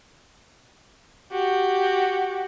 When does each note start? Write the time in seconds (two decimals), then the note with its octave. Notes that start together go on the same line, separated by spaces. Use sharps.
1.31 F#4 G4